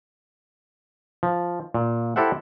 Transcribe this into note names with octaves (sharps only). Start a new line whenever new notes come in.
F3
A#2
E4 G4 A4 C5 E5 F#5